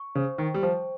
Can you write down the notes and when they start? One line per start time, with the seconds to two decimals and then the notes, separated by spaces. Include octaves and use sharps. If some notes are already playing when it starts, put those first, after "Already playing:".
Already playing: C#6
0.15 C#3 C5
0.38 D#3 G5
0.54 G3
0.62 F3 C5